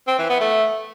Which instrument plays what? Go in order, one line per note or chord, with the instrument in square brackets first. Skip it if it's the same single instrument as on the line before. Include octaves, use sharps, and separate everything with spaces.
[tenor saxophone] C4
E3
B3
A3